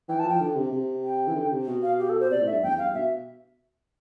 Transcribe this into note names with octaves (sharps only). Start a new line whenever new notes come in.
E3 G5
A5
F3
G5
D3
C3
C3
G5
E3
D3
D3
C3
B2
F5
G4
A4
C5
C3 D5
A2
E5
G2
E2 G5
G2 F5
B2 E5